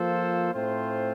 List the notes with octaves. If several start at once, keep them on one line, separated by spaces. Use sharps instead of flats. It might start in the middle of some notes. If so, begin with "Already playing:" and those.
Already playing: F3 A#3 F4 A4 C5
A2 A3 C4 F4 C5